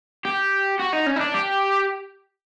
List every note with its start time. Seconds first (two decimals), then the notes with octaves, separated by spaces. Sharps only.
0.25 G4
0.80 F#4
0.93 D#4
1.07 C#4
1.16 D#4
1.20 D4
1.34 G4